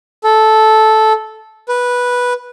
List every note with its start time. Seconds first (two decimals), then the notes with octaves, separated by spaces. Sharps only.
0.24 A4
1.69 B4